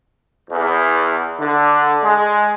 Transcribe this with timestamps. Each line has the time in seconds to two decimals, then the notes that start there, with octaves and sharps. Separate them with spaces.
0.50 E2
1.40 D3
2.03 G#3